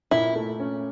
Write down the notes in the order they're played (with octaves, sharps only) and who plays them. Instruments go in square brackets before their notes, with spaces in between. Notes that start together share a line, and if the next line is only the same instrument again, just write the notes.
[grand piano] A#2 [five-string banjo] E4
[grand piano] A3
C#4